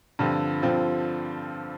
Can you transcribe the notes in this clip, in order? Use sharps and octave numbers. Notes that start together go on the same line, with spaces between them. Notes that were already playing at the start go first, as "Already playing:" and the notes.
G2 D3 F3 C4 F4
G2 D3 F3 C4 F4